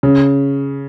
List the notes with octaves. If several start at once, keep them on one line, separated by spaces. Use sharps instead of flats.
C#3